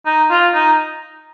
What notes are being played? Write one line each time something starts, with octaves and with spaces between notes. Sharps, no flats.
D#4
F4
D#4